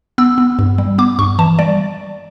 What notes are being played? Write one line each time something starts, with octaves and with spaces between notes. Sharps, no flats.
B3 E6
B3
G2
G3
B3 D6
G2 C#6
E3 A5
G3 D5